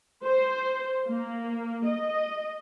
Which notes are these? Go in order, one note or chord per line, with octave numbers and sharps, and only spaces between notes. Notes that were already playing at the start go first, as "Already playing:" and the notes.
C5
A#3
D#5